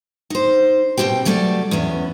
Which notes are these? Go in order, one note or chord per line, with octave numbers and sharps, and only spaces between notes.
D#4 C5
B2 E3 C4 G4 G5
F#3 G3 A3 G4 C5 D5
E2 B3 C#4